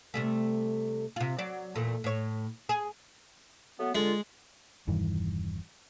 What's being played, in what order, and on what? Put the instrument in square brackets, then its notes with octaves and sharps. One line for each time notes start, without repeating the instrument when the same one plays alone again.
[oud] C3 G3 A3
C3 F4
F#3 D5
E2 A#2 A3
A2 C#5
G#4
[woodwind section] F#3 A3 B3
[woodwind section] D3 F4 [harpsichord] G#3
[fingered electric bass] E1 G2 D#3 E3